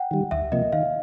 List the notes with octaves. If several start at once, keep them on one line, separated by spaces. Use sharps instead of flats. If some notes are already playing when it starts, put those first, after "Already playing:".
Already playing: F#5 G5
D#3 G3
D2 E5
C3 F3 A#3 D#5
D#3 F5